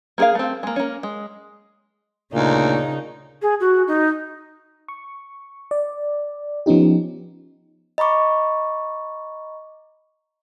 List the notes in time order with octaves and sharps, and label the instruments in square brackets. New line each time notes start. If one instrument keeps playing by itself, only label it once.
[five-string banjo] A#3 F#4 G#4 A#4 F5
A3 C4
G#3 A#3
A#3 C#4
G#3
[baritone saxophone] D2 [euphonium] A#2 [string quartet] C#3 D#4
[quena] G#4
F#4
D#4
[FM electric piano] C#6
D5
F3 B3 C#4 D#4 G4
[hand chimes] D#5 A#5 B5 C#6 D6